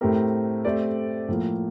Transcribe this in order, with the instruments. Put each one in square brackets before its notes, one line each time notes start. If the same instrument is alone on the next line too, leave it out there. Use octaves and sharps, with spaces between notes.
[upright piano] A2 A3 C4 G4 A#4
A3 C4 G4 D5
A2 F3 A#3